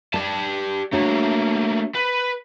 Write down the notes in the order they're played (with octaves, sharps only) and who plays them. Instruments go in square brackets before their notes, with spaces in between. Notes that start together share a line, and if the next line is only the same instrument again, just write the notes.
[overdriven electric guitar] G4 A5 [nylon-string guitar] D5
[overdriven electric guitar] A3 A#3 [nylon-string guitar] D4 F#4 C#5
[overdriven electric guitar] B4